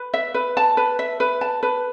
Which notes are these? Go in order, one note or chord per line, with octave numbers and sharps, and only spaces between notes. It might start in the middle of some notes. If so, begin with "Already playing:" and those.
Already playing: B4
E5
B4
A5
B4
E5
B4
A5
B4